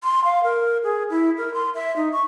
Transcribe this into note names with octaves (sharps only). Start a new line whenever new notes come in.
C6
F5
A#4
G#4
E4
A#4
C6
E5
D#4
C#6